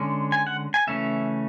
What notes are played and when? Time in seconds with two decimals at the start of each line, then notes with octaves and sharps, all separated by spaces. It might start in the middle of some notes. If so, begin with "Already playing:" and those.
Already playing: D3 G#3 C#4
0.32 G#5
0.47 F#5
0.74 G#5
0.87 C#3 E3 A3 C#4 E5